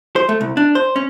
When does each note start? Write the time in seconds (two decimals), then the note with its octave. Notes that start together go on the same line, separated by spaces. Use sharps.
0.16 C5
0.29 A3
0.41 C2
0.57 D4
0.75 C5
0.96 C#4